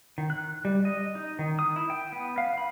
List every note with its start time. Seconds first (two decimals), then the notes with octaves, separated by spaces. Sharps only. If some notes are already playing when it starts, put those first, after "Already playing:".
0.18 D#3
0.30 F#6
0.65 G3
0.85 D#5
1.15 D#4
1.39 D#3
1.59 D#6
1.76 E4
1.90 G5
2.12 B3
2.38 F5
2.58 B5